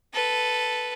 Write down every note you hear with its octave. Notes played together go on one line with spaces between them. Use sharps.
A4 B4